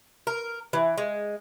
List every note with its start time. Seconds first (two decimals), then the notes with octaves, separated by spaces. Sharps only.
0.27 A#4
0.73 E3
0.97 G#3